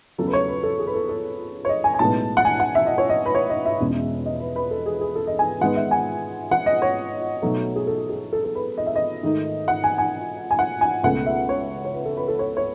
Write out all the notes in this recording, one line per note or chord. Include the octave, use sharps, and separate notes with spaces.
E2 C#3 F#3 A3 A4
B4
C#5
B4
A4
G#4
B4
A4
A4
C#5
D#5
G#5
G#5
B1 A2 G#3 B3 A5
F#5
G#5
F#5
E5
D#5
C#5
D#5
B4
C#5
D#5
E5
E1 E2 B2 G#3 C#4
D#5
B4
B4
A4
G#4
G#4
A4
D#5
G#5
G#2 D#3 G#3 B3 F#5
E5
G#5
F#5
D#5
C#5
B1 B2 F#3 A3
G#4
A4
G#4
A4
A4
B4
D#5
E5
D#5
G#2 D#3 A3 D#4
F#5
G#5
G#5
G#5
F#5
G#5
C#2 B2 A3 C#4 F#5
E5
C#5
C#5
B4
A4
B4
A4
C#5
C#5